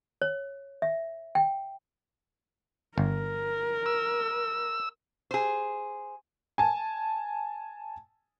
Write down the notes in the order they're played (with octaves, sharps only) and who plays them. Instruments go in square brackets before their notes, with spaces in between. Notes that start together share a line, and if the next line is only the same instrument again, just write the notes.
[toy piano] C#5
E5
G5
[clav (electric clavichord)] G1 [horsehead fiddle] A#4
[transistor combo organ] E6
[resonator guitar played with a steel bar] G#4 C5
[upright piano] G#5 A5